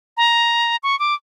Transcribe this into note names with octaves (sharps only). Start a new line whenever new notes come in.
A#5
C#6
D6